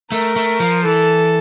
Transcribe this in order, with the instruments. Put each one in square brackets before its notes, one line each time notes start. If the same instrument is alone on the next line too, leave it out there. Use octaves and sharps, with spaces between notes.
[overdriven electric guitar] A3 [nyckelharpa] A#4
[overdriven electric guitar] A3
F3
[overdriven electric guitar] E3 [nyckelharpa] A4